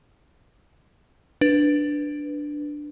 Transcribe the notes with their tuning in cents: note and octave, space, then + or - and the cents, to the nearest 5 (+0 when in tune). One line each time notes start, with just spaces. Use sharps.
D4 +0 B4 +0